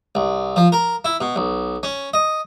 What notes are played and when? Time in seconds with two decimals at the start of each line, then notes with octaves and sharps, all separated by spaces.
0.15 C2
0.56 F3
0.72 A#4
1.05 E4
1.21 B2
1.36 B1
1.83 C#4
2.14 D#5